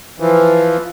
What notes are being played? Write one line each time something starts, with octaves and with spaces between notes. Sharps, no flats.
E3 F3